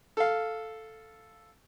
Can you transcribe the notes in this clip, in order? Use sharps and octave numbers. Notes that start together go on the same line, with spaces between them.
A4 F5